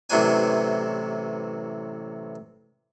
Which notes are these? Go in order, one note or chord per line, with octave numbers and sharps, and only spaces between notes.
A1 C3 E3 F#3 D4 G#5